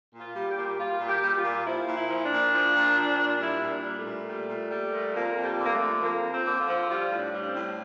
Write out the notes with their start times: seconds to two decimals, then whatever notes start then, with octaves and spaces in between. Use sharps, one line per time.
0.13 A#2
0.19 F4
0.34 G3
0.49 G4
0.57 A#2
0.78 G3 F4
1.00 A#2
1.07 G4
1.22 G3
1.37 F4
1.44 A#2
1.65 F3 E4
1.87 A#2
1.95 E4
2.09 F3
2.24 D4
2.31 A#2
2.53 F3
2.75 A#2
2.97 F3
3.19 A#2
3.40 G3 E4
3.62 A#2
3.69 D4
3.84 G3
3.98 A3
4.05 A#2
4.28 G3
4.48 A#2
4.71 G3
4.93 A#2
5.14 F2 A#3
5.36 F2
5.43 G3
5.59 D3
5.64 A#3
5.73 A3
5.80 F3
6.01 F2 A#3
6.24 F2
6.31 C4
6.46 D3
6.59 F4
6.68 F3
6.89 G3 F4
7.10 A2
7.17 D4
7.32 G3
7.41 D4
7.47 C4
7.54 A2